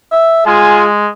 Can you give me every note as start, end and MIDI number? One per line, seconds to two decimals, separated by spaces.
0.12 0.42 76
0.46 1.09 56
0.46 0.87 65
0.46 0.87 68
0.46 0.87 80